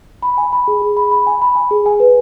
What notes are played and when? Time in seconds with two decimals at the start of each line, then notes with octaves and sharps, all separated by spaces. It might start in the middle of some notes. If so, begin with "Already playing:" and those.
0.22 B5
0.38 G#5
0.53 B5
0.68 G#4
0.82 G#4
0.97 B5
1.11 B5
1.27 G#5
1.42 B5
1.55 G#5
1.71 G#4
1.86 G#5
2.00 B4